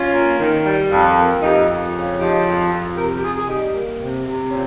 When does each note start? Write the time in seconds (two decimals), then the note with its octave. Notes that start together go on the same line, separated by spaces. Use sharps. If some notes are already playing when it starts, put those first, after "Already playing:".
Already playing: C#4 F4
0.13 A#3
0.39 D#3
0.65 G3
0.91 F2
1.17 A#3
1.42 F2 D#4 G4
1.68 F2
1.94 C#3
2.20 F3 D#4 G4
2.46 F2
2.72 F2
2.97 C3 G4 A#4
3.16 G4
3.23 C3 F4 G#4
3.37 G#4
3.49 G3 D#4 G4
3.75 A#3
4.00 C3
4.27 C3
4.48 C#4
4.52 A#2 C4